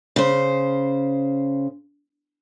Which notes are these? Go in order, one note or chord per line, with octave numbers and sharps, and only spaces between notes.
C#3 C5